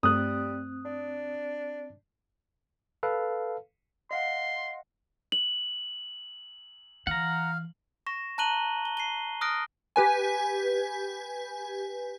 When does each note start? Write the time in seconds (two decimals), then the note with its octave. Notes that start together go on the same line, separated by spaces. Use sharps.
0.03 G2 G3 A3 C4 D#6 F#6
0.85 D4
3.03 A4 B4 F5
4.11 D#5 F5 F#5 C6
5.32 F#7
7.07 E3 F5 F#5 A#5
8.07 C#6 A#6 E7
8.38 A5 A#5 F#6 D#7 F#7 G7
8.85 G7
8.97 C7 D#7 G7
9.41 D#6 F6 F#6 A#6 D7
9.96 G4 B4 G#5